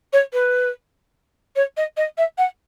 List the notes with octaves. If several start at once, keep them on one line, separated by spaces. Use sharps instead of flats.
C#5
B4
C#5
D#5
D#5
E5
F#5